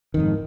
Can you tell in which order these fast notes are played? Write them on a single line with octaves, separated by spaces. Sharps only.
D#3 F2 G#2